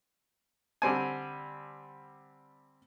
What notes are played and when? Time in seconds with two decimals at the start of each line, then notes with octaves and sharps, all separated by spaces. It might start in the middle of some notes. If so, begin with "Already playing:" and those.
0.82 D3 G3 C4 G#5